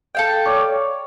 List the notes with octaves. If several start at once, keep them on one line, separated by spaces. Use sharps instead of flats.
A4 F5 G5
C#5 D5